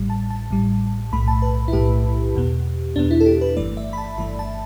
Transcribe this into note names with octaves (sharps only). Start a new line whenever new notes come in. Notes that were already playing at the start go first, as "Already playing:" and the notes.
Already playing: A1 A2 G3
A5
A5
A1 A2 G3
B1 A2 A3 B5
A5
B4
E4
B1 A2 A3 G4
E2 B2 B3
E2 B2 B3 D4
E4
A4
G4
B4
G1 G2 E3 A3 D5
E5
B5
A5
G1 G2 E3 A3 B5
A5